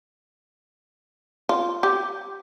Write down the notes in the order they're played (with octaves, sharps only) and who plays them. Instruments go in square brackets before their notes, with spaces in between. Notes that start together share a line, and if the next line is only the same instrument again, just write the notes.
[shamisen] F4
G4